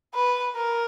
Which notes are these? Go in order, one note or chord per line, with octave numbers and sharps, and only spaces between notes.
B4
A#4